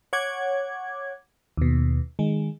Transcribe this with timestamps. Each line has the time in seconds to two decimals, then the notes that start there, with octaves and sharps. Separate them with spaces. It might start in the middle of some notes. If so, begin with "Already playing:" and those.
0.13 C#5 F#5 D6 G#6
1.57 D#2 B2
2.19 D#3 G#3